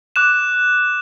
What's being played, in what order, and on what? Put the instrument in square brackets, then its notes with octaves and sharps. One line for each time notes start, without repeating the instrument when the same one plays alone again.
[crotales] D6 F#6 E7